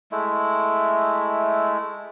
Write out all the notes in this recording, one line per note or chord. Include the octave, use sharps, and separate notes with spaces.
G#3 A3 E4